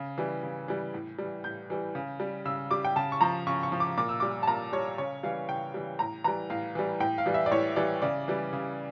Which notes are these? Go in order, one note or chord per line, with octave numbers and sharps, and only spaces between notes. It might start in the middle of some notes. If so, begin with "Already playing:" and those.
Already playing: C#3
E3 G3
C#3
E3 G3
A2
E3 G3
A2 G6
E3 G3
C#3
G3
C#3 E6
G3 D6
G5
C#3 A5
C#6
F3 A#5
C#3 C#6
C#6
F3
D6
A#2 D6
E6
G3 D6
A5
A#2 A#5
G3 C#5
C#3 C#5
E3 G3 F5
C#3 G5
E3 G3
A2 A#5
E3 G3 A#5
A2 F5
E3 G3
A2 G5
F5
E3 G3
E5
D5
A2 C#5
E3 G3 D5
C#3 D5
E3 G3
C#3